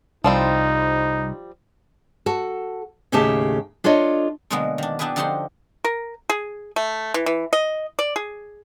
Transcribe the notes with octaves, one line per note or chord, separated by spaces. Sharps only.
C2 F3 G3 C4 D#4
F#4 A4
D#2 A2 C#3 A3 G4 A5
D4 F4 A4 C#5 D#5
B2 D3 F#3 G#3 A#3 B3
D#3 D4
B3 D4 E4 G4 G#4 B4
D3 F3 D#4 G4 F#5 C6
A#4
G#4
A3
E3
E3
D#5
D5
G#4